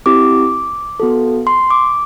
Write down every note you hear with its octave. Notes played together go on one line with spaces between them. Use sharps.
C4 E4 G4 D6
B3 F#4 A4
C6
D6